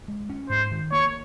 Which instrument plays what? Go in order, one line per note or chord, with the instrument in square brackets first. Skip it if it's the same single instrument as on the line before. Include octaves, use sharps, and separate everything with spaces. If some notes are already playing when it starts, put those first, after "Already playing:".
[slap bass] G#3
C#4
[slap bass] G#2 [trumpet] C5
[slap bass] D#3
[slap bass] A#3 [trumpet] C#5